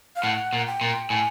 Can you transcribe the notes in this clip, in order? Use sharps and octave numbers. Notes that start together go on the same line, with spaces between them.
F5
A2 F#5
A#2
G5
A#2
A2 G#5